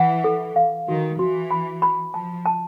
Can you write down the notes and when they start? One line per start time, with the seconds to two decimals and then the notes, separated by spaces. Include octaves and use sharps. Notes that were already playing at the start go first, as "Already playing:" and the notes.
Already playing: E3 F#5
0.24 A4
0.56 F5
0.88 D#3 F#4
1.19 E3 F#4
1.51 B5
1.82 B5
2.14 F3 A5
2.46 A5